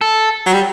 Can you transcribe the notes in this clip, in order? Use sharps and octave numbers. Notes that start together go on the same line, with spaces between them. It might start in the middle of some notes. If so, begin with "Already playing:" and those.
A4
F#3
G3